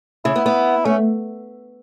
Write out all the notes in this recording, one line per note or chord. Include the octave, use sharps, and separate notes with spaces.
C#3 E4
B3
B3
A3 C#4